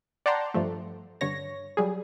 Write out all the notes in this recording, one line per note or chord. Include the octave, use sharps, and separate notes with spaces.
D5 F#5 G5 A5 A#5 C6
G2 F3 A3
G2 D3 C#5 A#6
F#3 G3 G#4